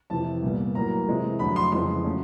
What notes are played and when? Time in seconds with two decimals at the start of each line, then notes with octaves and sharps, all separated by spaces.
0.10 F2 C3 E3 A5
0.42 C2 A#2 G3 B3
0.75 A2 F#3 A#3 A#5
1.08 C3 E3 G#3 C4
1.39 F2 D3 F#3 A3 B5
1.56 C6
1.72 F2 C#3 E3 G#3 C6
2.04 C#3 F#3 A3 C#4